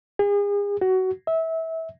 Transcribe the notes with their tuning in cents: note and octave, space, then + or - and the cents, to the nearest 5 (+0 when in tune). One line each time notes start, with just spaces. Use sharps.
G#4 -40
F#4 +20
E5 -25